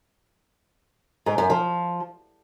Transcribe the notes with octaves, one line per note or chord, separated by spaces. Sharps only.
G#2
F#2
F3